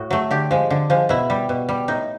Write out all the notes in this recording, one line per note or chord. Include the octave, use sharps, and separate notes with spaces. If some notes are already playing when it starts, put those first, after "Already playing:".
Already playing: A2 F#4
F#3 A3
D3 G4
F3 G#3
D3
F3 G#3
B2 E4
G3
B2
G3
A2 D#4